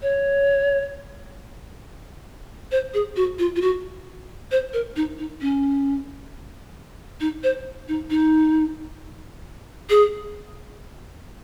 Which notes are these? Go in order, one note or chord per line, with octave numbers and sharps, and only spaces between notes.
C#5
C5
G#4
F#4
F4
F4
F#4
C5
A#4
D#4
D#4
C#4
D#4
C5
D#4
D#4
G#4